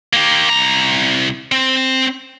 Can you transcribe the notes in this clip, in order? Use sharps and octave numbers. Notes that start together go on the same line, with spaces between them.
A#3 G4
C2 A#5
C4